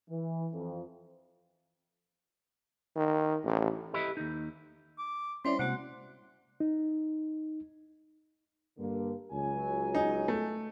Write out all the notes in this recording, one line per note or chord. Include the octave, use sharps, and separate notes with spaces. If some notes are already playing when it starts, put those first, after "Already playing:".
E3
F2
D#3
A1
E4 G4 A4 B4 D#5 E5
D#2 D#4
D6
G3 C#4 E4 C5 D5 C6 D6
C3 G#3 A#3 F#4 F#5
D#4
G2 D3 A#3
C#2 F#3 G#5
D#4
A3